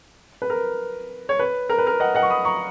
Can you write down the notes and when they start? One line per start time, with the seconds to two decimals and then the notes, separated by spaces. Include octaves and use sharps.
0.42 B4
0.50 A#4
1.29 C#5
1.39 B4
1.70 A#4
1.78 B4
1.87 A#4
2.00 D#5 F#5
2.15 D#5 F#5
2.23 C#6
2.30 B5 D#6
2.45 A#5 C#6